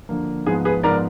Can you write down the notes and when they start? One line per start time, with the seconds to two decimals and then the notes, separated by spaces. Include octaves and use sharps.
0.09 D3 F3 A#3
0.46 G#2 F3 B3 G#4
0.65 G#4 B4
0.84 G#2 F3 B3 A#4 D5